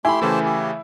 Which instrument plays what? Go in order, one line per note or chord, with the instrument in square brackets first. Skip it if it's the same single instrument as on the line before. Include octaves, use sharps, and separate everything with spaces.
[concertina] A3 G4 C6 [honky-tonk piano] E4 B5 [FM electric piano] G#5
[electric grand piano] C#3 E3 A3 [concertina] G4 C5 A5
[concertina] G4